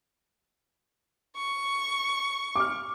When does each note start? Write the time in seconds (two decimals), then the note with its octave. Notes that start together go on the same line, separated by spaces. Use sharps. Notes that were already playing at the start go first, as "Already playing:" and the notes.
1.37 C#6
2.56 D6 F6